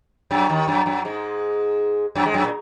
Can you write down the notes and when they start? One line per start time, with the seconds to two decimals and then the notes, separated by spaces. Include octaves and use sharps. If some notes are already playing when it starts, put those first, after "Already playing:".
0.31 F#2 F#3
0.49 D#2 D#3
0.68 F#2 F#3
0.86 F#2 F#3
1.05 G#2 G#3
2.15 F#2 F#3
2.26 G#2 G#3
2.34 F#2 F#3
2.44 A#2